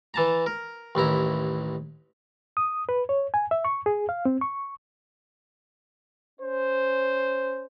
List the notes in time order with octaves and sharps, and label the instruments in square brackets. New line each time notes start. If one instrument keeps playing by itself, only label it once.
[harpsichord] E3 A5 A#5
A#4
A1 D#2 E4 A#5
[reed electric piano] D#6
B4
C#5
G#5
E5
C#6
G#4
F5
C4
C#6
[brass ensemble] C#4 C5